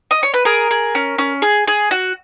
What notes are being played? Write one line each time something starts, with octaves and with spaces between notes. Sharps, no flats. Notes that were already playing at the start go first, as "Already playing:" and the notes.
D#5
C#5
B4
G#4 A#4
G#4
C#4
C#4
G#4
G#4
F#4